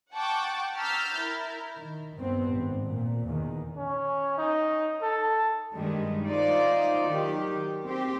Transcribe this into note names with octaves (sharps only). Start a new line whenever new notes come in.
F#5 G5 A5 C#6 D6
A#5 E6 F6 G6 A6 B6
E4 A#4
D#3
G2 B3 C4
G#1
A#2
E2 D#3
C#4
D#4
A4
G2 D#3 G3 G#3
D#4 F4 C5 D5
D#3 F#3 G4
C4 G4